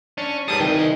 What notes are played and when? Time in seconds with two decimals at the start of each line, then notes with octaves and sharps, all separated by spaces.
0.18 C#4 D4
0.48 G#2 G3 G#4 B4 A5 D#6
0.60 C2 D#3 G5